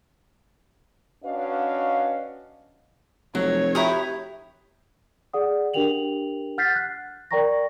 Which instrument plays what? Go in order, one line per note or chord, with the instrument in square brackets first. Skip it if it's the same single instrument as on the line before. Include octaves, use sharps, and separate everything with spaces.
[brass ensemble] C#4 D4 F#4 B4 D#5 F5
[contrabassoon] F1 [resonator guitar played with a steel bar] F#3 [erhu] C#5
[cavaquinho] E4 A#5 D#6 [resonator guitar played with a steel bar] F#4 G4
[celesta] G#4 D5 F#5 D#6
D4 G4 A#4 G5 F7 F#7
F#5 F6 G6 A6 B6 C7
F#6
A#4 D5 G5 A#5 C#6 A#6